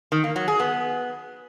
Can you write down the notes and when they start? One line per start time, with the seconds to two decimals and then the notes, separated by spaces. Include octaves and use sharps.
0.12 D#3
0.24 A#3
0.36 F#3
0.48 G#4
0.60 B3